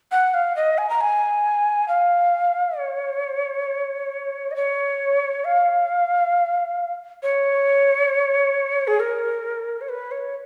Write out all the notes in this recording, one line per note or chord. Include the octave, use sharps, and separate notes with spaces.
F#5
F5
D#5
G#5
A#5
G#5
F5
C#5
D#5
C#5
F5
C#5
G#4
A#4
C#5
B4
C#5